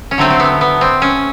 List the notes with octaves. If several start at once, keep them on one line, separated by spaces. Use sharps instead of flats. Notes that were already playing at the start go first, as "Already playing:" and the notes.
C#4
D3 F#3 A3 C4
C4
B3
B3
C4
C#4